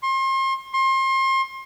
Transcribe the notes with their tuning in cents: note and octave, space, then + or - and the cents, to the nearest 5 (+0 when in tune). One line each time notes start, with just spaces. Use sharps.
C6 +35
C6 +35